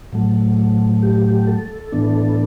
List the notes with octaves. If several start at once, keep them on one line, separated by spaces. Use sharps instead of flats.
A2 F#3 A3
G4
A4
A2 E3 B3 D4